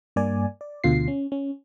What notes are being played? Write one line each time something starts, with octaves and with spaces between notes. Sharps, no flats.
G2 A#3 D5 G#5
D5
D2 B2 D3 F4 C7
C#4
C#4